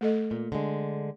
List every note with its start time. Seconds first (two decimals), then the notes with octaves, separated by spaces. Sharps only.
0.01 A3 A4 D#5
0.31 A#2
0.52 D3 G#3